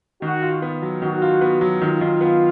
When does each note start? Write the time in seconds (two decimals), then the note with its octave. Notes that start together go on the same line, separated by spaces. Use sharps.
0.22 D#3 F#4
0.42 F4
0.62 B3
0.82 F#3
1.02 D#3 F#4
1.22 F4
1.41 B3
1.61 F#3
1.81 D#3 F4
2.01 D#3
2.21 B3